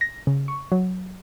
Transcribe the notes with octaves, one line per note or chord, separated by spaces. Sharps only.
A#6
C#3
C#6
F#3